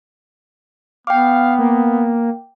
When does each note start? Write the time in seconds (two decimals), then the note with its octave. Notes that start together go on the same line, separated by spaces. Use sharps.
1.07 B3 F5 G5 D6
1.59 A#3